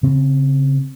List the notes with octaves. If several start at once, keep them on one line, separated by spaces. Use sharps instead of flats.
C#3 C4